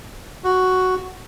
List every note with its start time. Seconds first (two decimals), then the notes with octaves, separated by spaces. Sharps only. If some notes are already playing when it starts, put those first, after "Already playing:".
0.44 F#4